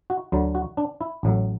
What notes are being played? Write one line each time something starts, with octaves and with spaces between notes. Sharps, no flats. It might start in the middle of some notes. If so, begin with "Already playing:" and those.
F#4
D2 D3 F#3
F#4
D4
E4
A1 A2 F#3